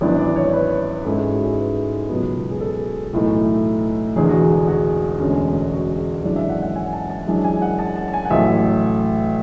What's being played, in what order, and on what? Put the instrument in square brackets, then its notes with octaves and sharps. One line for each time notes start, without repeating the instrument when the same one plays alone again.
[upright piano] G#1 F#2 E3 B3 D4 D5
D5
C#5
B4
G#2 G#3 C#4 E4 A4
G#4
F#4
G#4
B4
C#2 B2 F#3 B3
G#4
A4
B1 A2 E3 A3
E1 E2 D3 G#4
F#4
G#4
G#4
F#4
E1 D2 D3 G#3 C#4
F#4
G#4
G#1 F#2 E3 G#3 D4 D5
E5
F#5
F#5
G#5
A5
A5
F#2 E3 G#3 D4
G#5
F#5
A5
A5
A5
G#5
F#5
A1 A2 F#3 A3 E5